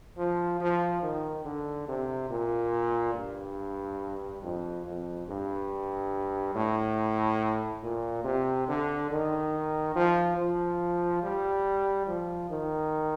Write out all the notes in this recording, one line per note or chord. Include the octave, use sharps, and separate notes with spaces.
F3
F3
D#3
D3
C3
A#2
G2
F2
F2
G2
A2
A#2
C3
D3
D#3
F3
F3
G3
F3
D#3